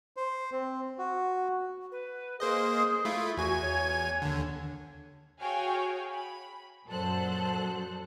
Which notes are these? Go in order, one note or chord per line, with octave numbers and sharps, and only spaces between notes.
C5
C4
F#4
B4
A#3 G#4 C5 D#5
A3 E4 F4
E2 F#4 G#5 G#6
C#5
D#2 D3
F#4 G#4 C#5 F5 G5 G#5
B5
F#2 A#2 F#3 A4 C5 F#6